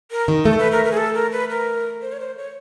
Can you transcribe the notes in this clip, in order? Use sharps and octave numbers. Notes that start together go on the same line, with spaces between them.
A#4
D#3
A3 A4
B4
A#4
A#4
G#4
A4
A#4
B4
A#4
C5
C#5
C5
C#5